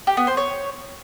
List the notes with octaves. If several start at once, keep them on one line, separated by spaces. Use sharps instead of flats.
G4
B3
C5
C#5